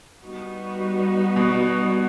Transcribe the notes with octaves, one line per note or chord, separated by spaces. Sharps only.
G3 B3 D#4 F#4
B2